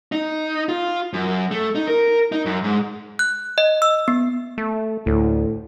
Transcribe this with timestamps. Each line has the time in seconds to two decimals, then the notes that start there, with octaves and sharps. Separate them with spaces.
0.12 D#4
0.69 F4
1.13 F#2
1.51 A3
1.75 D#4
1.88 A#4
2.32 D#4
2.45 F#2
2.64 G#2
3.19 F#6
3.58 D#5
3.82 E6
4.08 B3
4.58 A3
5.06 D2 A2